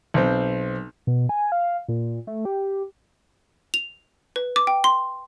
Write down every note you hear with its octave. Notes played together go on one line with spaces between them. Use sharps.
B1 C4
B2
G#5
F5
A#2
A3
G4
F7
B4
D6
G5
C6